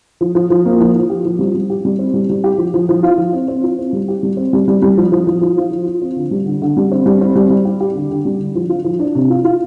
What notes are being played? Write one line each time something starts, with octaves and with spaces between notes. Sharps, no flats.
F3
F3
F3
A#3
F3
F3
G4
F3
G3
G3
G4
G3
C4
G3
G3
G4
F3
F3
F3
F4
F3
C4
C4
F4
C4
G3
G4
G3
C4
G3
G3
G3
F3
F3
F3
F3
F4
F3
F4
C4
D3
G3
D3
D3
G3
C4
G3
C4
G3
G3
G4
G4
D3
D3
G3
D3
F3
F4
F3
D4
C3
F4
F4